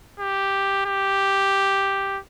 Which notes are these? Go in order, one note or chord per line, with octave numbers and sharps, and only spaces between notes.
G4
G4